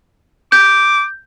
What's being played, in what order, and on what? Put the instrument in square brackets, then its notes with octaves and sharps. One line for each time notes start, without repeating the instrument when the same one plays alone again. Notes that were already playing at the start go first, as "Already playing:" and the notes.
[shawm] D6 [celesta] G6